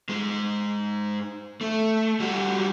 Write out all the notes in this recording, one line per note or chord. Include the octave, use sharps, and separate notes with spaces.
G#2 G#3
A3
G3 F#4